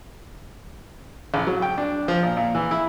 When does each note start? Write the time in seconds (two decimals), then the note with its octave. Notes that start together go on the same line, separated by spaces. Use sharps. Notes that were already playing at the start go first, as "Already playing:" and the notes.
1.34 A1
1.47 F#3
1.62 G5
1.78 D4
2.08 F3
2.23 A#2
2.37 A#2
2.55 E3
2.71 E4